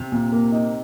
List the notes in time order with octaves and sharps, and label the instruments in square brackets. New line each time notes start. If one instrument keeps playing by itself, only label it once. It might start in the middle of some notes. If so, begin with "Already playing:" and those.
Already playing: [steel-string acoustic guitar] C3
[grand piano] A#2
A#3
D#4